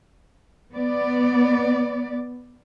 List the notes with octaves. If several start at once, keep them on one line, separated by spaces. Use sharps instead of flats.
B3 D5